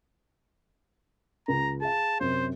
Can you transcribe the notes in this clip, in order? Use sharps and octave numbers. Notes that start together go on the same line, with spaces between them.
C#2 A#5
G#4 F5 A5
F#2 C3 C5